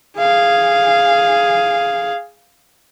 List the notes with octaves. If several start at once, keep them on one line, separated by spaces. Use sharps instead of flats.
G#4 F5